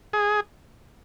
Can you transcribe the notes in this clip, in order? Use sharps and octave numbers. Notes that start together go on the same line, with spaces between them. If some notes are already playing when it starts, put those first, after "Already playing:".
G#4